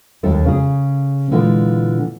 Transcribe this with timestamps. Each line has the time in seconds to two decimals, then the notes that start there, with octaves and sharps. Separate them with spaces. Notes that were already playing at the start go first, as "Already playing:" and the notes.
0.23 D#2 G3 D4 A4 A#4
0.45 C#3 G#4
1.31 A#2 D3 E3 G#3